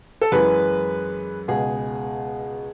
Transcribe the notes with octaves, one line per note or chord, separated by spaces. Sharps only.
A4
F#2 E3 G#3 G#4 B4
C#2 B2 G#3 G#4